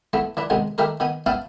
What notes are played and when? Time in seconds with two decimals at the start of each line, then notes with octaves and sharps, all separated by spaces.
0.13 E3 A3 B3
0.37 E3 D4 B4
0.50 C3 D#3 G#3 B3
0.78 D#3 A3 G4 A#4 B4
1.00 D#3 B3 G#5
1.26 B3 C#4 E4 F5 G5 A5